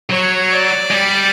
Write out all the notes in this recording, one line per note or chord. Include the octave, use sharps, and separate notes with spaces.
F#3 C#5
D5
G#3
G3